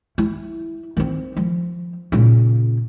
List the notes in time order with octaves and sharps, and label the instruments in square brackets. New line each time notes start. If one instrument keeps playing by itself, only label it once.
[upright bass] E4
D#3 C4
F3
A#2 C#3